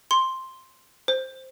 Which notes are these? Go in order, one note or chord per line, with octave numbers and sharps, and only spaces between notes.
C6
C5